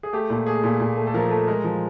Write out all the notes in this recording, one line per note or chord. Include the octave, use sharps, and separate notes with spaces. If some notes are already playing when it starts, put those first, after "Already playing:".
G#4
A3 G4
A#2
A3 G#4
A#2
A#2
A3
A4
F3 A#4
A3
G#3 A#4
F3